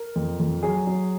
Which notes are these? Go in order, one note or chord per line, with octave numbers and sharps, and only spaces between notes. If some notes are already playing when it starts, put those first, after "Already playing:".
Already playing: A#4
F2
F2
F#3 G#4
F#3